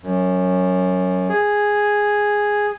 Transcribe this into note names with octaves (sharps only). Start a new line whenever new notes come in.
F#2
G#4